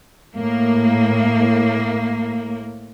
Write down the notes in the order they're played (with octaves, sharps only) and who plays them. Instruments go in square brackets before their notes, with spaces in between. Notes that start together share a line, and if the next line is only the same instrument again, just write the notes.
[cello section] A2 A#3